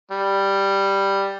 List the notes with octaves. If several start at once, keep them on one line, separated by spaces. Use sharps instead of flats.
G3